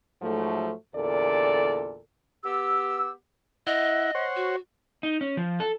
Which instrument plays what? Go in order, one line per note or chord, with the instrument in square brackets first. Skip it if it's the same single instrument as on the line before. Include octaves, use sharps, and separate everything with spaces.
[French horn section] G#2 F3 F#3 A3
E2 A#2 D3 A4 A#4 D5
[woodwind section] B3 G4 E6
[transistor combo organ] E4 F#5 [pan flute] D#5
[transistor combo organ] C5 C#5 F#5
[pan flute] F#4
[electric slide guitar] D#4
C#4
F3
A4